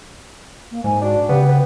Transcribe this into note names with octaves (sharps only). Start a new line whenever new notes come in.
A#3
G#2 G#5
D4 F#4
C#3 B3 G4
B3